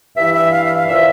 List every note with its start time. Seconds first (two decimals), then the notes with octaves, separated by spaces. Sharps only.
0.16 G2 E3 E5
0.34 E5
0.51 F5
0.64 E5
0.76 F5
0.87 A#2 F3 E5